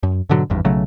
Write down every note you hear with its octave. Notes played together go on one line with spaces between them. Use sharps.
F#2
G#2 B2 D3 F#3
G#1 E2 G2
B1 C#3 F#3 A3